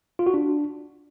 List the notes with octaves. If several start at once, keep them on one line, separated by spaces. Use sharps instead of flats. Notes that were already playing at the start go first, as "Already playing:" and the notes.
F4
F#4
D4